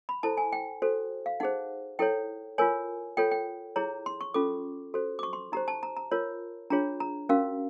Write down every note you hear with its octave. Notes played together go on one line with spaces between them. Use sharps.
B5
E4 A4 C5 A5
G#5
G5
F#4 A4 C5
F5
D#4 G#4 C5 F#5
E4 A4 C#5 G5
F4 A#4 C#5 G#5
F4 A4 C#5 G5
G5
E4 G#4 C#5 A#5
C6
C#6
C#4 F4 A4 D6
F#4 A4 C5
D6
C#6
C6
D#4 G4 C5 A#5
A5
A#5
A#5
F4 A#4 C#5
D4 F4 G#4 C#5 A#5
A#5
C#4 F#4 A#4 F5